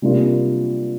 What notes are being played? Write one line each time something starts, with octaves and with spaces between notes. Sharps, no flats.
C3 G3 A#3 D4 F4